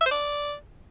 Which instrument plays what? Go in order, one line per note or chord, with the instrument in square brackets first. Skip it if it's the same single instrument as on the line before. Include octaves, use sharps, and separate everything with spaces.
[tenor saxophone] E5
C5
D5